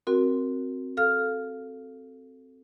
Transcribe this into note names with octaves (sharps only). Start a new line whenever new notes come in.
C4 F#4 A#4
A4 F5 F6